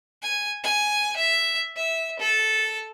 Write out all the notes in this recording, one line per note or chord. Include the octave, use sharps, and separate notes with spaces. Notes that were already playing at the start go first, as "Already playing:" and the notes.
G#5
G#5
E5
E5
A4